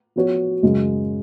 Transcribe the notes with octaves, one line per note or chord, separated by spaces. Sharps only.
F3 B3 F#4 C#5
F#2 C#3 G#3